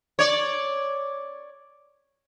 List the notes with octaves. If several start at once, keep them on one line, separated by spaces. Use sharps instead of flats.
C#5 D5